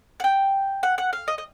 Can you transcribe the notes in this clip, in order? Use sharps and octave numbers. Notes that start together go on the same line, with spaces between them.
F#5
G5
F#5
F#5
F5
D#5
D#5